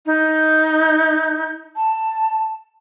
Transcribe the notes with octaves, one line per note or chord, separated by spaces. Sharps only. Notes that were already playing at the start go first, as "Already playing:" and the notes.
D#4
A5